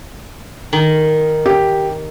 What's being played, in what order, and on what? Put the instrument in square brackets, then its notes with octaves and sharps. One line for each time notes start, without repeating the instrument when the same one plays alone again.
[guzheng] D#3
[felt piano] G4